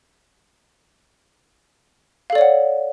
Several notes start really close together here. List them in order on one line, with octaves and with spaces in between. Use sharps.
F5 A4 D5 C#5 F#5